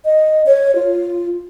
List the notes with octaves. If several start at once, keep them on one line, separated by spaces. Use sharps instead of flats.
D#5
C#5
F4